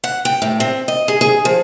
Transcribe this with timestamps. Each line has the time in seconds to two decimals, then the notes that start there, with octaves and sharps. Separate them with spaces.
0.04 F#5
0.25 G5
0.42 A2
0.60 C4
0.88 D#5
1.08 G#4
1.21 G#4
1.45 F3